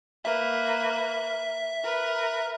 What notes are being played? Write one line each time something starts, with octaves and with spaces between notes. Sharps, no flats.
A#3 B4 E5
A#4 B4